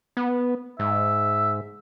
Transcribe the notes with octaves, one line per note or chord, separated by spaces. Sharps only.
B3
G#2 E5